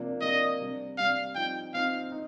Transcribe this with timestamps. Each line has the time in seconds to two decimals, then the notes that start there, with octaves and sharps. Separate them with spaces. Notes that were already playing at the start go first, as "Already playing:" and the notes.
Already playing: C3 F3 A#3 D4
0.21 C3 F3 A#3 D4 D#5
0.60 C3 G3 D4
0.97 C3 G3 D4 F5
1.35 F3 C4 D#4 G5
1.73 F3 C4 D#4 F5
2.12 D#4